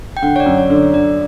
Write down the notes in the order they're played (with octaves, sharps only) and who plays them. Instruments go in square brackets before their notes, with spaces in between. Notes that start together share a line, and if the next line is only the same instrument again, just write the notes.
[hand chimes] G5
[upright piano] D3 [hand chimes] F#5
[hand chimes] C#5
D5
[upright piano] F#2
[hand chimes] C#5
[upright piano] D3
[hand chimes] D5
[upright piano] D3 [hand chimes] D5